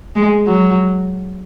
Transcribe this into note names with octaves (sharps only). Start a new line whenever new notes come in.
G#3
F#3